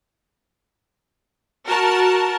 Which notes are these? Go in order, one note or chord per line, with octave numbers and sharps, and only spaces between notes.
F#4 A#4 A5